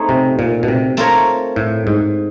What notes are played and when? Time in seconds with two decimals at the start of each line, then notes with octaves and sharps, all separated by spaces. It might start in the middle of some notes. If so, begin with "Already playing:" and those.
Already playing: A3 C4 D#4 G#4 C#5
0.09 C3
0.39 A#2
0.63 B2
0.68 C3
0.97 A3 C4 F4 A#4 C#5
1.56 A2
1.87 G#2